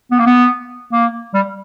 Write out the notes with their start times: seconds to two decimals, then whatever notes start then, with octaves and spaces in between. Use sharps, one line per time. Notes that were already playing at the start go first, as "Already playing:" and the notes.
0.11 B3
0.19 A#3
0.26 B3
0.93 A#3
1.34 G3